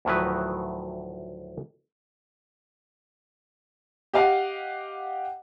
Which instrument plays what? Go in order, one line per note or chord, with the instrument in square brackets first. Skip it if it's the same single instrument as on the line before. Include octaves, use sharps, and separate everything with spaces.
[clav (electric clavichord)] D2 A2 D#3 F3 F#3 B4
[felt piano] G4 D#5 F5 F#5